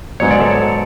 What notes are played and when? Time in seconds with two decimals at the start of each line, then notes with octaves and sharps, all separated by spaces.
0.20 G#2 F#3 B3 D4 C#5
0.31 D5
0.40 A4 C#5